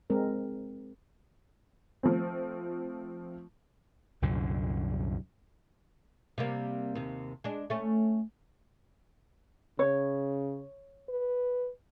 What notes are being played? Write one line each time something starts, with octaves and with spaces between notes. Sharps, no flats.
G#3 C4 A#4
F3 A3 C4
C2 F#2 A#2 D3
C3 G3 A#3
D#2 C3
G#3 D4
A3 C#4
C#3 C#5
B4